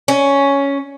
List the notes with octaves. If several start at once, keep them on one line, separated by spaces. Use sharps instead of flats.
C#4